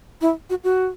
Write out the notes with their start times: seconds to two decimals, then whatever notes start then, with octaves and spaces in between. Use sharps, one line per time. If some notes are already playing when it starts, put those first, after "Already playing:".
0.21 E4
0.50 F#4
0.64 F#4